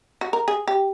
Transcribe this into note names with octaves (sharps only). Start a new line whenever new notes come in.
F#4
A#4
G#4
G4